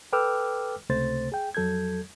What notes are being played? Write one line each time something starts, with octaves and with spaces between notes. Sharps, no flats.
A4 B4 G5 D6 E6 F6
C#2 C3 A3 C5 A6
G#4 G5
F2 F#3 A4 G6 G#6